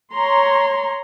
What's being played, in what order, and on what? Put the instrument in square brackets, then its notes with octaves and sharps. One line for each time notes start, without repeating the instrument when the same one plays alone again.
[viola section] C#5 A#5 C6